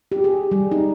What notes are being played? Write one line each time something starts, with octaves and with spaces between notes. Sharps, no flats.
G4
G#4
G3
D#4